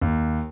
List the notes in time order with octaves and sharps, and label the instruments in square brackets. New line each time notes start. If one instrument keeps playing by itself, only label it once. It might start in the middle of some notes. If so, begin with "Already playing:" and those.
[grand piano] D#2